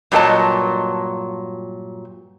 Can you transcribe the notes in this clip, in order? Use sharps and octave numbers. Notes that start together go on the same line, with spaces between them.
G2 A#2 F#3 G4 D#5 A5